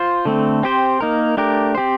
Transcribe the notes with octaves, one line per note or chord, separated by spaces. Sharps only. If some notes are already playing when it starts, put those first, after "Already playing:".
Already playing: F4 C5
D3 A3 C4
C4 G4 C5
A#3 D#4 A#4
A3 D4 G4 A#4
C4 G4 C5